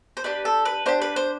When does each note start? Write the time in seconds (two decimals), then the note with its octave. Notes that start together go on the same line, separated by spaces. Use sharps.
0.17 C5
0.24 D4 G4 B4
0.45 A4
0.65 B4
0.86 D4 G4 C5
1.02 B4
1.16 C5